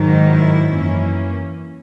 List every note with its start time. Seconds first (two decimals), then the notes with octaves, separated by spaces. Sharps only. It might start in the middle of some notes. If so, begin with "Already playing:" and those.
Already playing: G#2 D#3 F#3
0.26 E4
0.67 F#2 E3 A#3 C#4